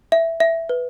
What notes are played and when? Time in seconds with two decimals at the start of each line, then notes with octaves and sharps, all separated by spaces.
0.12 E5
0.40 E5
0.69 B4